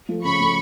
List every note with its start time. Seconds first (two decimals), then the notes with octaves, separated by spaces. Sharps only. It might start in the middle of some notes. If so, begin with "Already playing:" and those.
0.09 F3 A3
0.24 C#3 B5 C#6
0.40 F3 A3